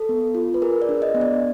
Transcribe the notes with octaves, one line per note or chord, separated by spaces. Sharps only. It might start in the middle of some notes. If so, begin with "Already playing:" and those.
Already playing: A4
B3
F4
B4
G#4 A#4
D5
D4
D#5
B3
D5